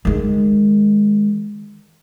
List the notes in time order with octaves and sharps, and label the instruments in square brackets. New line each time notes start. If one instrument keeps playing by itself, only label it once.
[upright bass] D#3 G#3